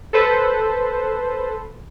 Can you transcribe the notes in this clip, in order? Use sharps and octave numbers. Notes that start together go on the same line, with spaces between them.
A4 B4 C5